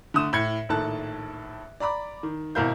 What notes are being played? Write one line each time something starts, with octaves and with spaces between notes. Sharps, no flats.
D3 A3 D#6 E7
A2 G#6 C#7
A#1 A2 D#3 A4 A5 F#6
D5 A#5 B5 D6
D#3
G#1 B2 E4 A#4 F5 G6